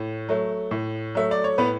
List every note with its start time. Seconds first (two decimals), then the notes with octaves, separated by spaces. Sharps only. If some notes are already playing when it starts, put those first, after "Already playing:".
Already playing: A2
0.29 F#3 A3
0.71 A2
1.15 F#3 A3 E5
1.31 D5
1.44 C#5
1.58 A2 B3 B4